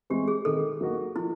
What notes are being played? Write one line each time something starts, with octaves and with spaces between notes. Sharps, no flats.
E3 G#3 C4 G4
G#4
D#3 A4
F#3 A#3 D#4 F#4
F3 E4